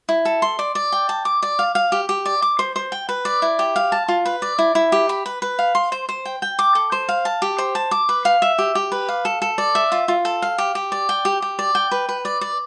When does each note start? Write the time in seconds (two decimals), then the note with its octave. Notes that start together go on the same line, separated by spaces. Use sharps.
0.09 E4
0.25 A4
0.42 C6
0.59 D5
0.75 D5
0.92 G5
1.09 A5
1.25 D6
1.42 D5
1.59 F5
1.75 F5
1.92 G4
2.09 G4
2.26 D5
2.42 D6
2.59 C5
2.76 C5
2.92 G5
3.09 B4
3.25 D5
3.42 E4
3.59 G4
3.76 F5
3.92 A5
4.08 F4
4.25 B4
4.42 D5
4.59 E4
4.75 E4
4.92 G4
5.09 B5
5.26 B4
5.42 B4
5.59 F5
5.75 C6
5.92 C5
6.09 C5
6.25 G5
6.42 G5
6.59 D6
6.75 A4
6.92 C5
7.09 F5
7.25 A5
7.42 G4
7.58 C5
7.75 A5
7.91 D6
8.09 B4
8.25 F5
8.42 E5
8.58 G4
8.75 G4
8.92 B4
9.09 F5
9.25 A4
9.42 A4
9.58 D5
9.75 E5
9.92 F4
10.08 F4
10.25 A4
10.42 F5
10.58 G4
10.75 G4
10.92 D5
11.09 G5
11.25 G4
11.42 G4
11.59 D5
11.75 G5
11.91 B4
12.09 B4
12.25 D5
12.41 D5